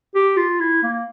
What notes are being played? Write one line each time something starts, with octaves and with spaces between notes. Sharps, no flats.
G4
F4
E4
A#3